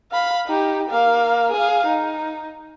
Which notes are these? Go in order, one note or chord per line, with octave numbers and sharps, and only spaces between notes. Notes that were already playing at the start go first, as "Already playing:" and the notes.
F5 B5
D#4 G4
A#3 F5
G#4 F5
D#4